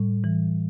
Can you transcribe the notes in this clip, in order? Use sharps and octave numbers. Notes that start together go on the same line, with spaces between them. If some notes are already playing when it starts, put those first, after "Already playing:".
Already playing: A2 G3
E3